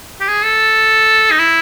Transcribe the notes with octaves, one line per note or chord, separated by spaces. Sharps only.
G4
G#4
A4
D#4
E4